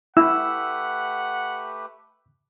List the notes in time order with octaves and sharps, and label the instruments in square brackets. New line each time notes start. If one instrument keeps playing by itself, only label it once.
[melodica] A3 G4 B4 [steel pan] E4 [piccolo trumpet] F#5 [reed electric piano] E6